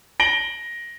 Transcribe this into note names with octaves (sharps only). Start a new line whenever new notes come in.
A#6 D7 F#7 G7